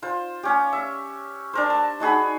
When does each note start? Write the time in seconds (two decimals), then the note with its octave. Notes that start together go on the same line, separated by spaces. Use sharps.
0.02 F4 C5
0.43 C#4 G4
0.73 E5
1.53 D4 A#4 C5
1.70 A5
2.00 D#4 F#4 G#4 B5